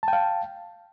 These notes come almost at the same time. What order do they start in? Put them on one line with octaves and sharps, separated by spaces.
A5 G5 F5